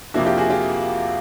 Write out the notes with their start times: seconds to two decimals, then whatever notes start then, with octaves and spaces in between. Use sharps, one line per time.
0.14 F2 C3 F3 A#3 D4 E4 F#4
0.25 F4 G4
0.38 F#4 G#4
0.50 F4 G4